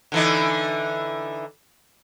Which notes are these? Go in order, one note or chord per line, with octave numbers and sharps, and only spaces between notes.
D3 E3 D#4